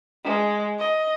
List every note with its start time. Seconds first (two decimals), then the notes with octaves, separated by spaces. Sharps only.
0.24 G#3
0.79 D#5